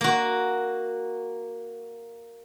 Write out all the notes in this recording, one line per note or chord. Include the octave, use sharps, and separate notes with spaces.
A#3 F#4